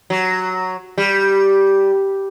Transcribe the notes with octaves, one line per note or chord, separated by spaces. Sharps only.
F#3
G3